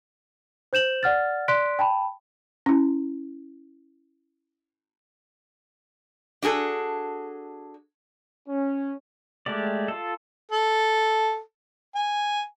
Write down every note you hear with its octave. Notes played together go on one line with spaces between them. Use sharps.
C5 G6 E7 F#7
D5 F#5 F6 A6
D5 C6 F#6 B6 D7
G5 A5 B5
C#4 E4
D4 F#4 G#4 A4
C#4
G#3 A3 G4 D5
F4 A4
A4
G#5